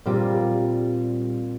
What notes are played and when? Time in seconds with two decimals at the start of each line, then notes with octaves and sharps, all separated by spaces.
0.06 A#2 G3 C4 F4